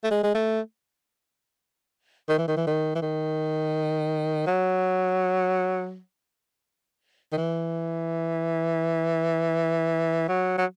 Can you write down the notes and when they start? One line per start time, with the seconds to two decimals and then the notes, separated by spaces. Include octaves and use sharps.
0.04 A3
0.11 G#3
0.23 G#3
0.35 A3
2.29 D#3
2.38 E3
2.48 D#3
2.57 E3
2.67 D#3
2.96 E3
3.02 D#3
4.47 F#3
7.33 D#3
7.38 E3
10.28 F#3
10.58 F#3